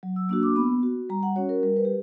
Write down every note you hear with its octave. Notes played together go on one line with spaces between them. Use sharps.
F#3
E6
A#3 D4 F#4 E6
D6
B3 B5
F#4
G3 A#5
F#5
C#4 F#4 C#5
A#4
G3 A#4
B4
G4